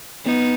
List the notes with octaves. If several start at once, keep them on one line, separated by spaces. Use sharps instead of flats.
B3 D#4